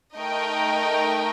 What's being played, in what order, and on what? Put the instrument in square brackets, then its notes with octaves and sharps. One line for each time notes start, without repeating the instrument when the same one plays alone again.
[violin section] A3 D#4 A#4 D#5 G5